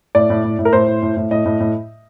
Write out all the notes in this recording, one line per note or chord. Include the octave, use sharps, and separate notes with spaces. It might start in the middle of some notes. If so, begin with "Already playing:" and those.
A2 D5
A2
A2
A2
A#4
A2 C5
A2
A2
A2
A2 D#5
A2
A2